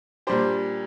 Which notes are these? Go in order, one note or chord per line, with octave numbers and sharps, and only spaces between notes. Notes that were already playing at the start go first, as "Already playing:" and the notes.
A#2 G3 D4 G4 C5